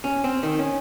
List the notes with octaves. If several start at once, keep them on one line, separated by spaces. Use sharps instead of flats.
C#4
C4
D#3
C#4